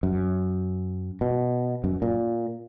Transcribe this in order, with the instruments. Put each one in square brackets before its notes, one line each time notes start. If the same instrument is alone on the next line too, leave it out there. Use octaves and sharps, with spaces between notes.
[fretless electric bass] F#2
B2
F#2
A#2